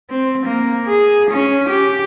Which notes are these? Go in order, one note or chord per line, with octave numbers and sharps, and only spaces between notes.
C4
A#3
G#4
C#4
G4